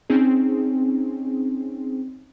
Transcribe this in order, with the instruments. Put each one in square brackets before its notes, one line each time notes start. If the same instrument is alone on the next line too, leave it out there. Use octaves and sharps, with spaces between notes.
[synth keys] C4 C#4 D#4 G#4